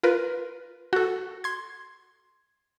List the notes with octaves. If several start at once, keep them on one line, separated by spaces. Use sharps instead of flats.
F4 A#4 B4
F#4 A4
C6 G#6